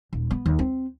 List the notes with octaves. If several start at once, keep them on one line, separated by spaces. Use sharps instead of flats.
D#1
B3
D#2
C4